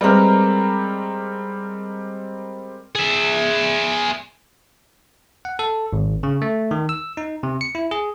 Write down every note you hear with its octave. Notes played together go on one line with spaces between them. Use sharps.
G3 G#3 C4 A#4 B4
G#4 E5
F#5
A4
G#1
C#3
A3
D#3
E6
D#4
C3
C#7
E4
G#4